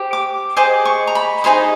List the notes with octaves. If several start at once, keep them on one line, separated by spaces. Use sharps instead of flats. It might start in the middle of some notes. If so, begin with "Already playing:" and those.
Already playing: G4 C5
D6
G#4 C5 D#5 D6
C#6
A#5
B5
D#4 G#4 C5 D#5 A#5